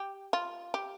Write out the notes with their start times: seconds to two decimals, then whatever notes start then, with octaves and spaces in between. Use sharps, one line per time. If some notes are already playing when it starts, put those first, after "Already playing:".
Already playing: G4
0.33 F4
0.74 G4